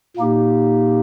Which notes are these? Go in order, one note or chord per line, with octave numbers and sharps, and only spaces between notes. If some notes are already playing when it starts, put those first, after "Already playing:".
A#2 A#3 D#4 G4